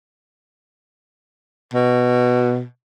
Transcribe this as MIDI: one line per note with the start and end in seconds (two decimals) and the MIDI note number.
1.74 2.64 47